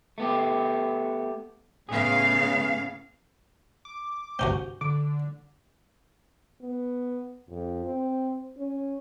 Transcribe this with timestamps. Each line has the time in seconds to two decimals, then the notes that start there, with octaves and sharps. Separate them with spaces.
0.18 A3 B3 G4
1.89 A2 C#3 B3 G#4 F5
3.85 D6
4.39 G1 C2 C4 C#4 F#4 G6
4.81 D3 D6
6.61 B3
7.49 F2
7.85 C4
8.58 C#4